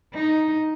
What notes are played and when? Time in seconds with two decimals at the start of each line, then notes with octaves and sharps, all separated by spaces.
0.14 D#4